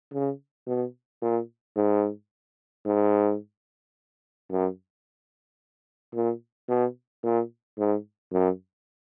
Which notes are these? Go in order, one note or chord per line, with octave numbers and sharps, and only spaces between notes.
C#3
B2
A#2
G#2
G#2
F#2
A#2
B2
A#2
G#2
F#2